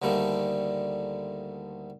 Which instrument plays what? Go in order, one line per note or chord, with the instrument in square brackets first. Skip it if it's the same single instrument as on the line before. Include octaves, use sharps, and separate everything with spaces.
[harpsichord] D2 D3 D#3 G3 A3 A#3